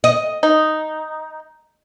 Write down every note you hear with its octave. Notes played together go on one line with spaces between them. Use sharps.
D#5
D#4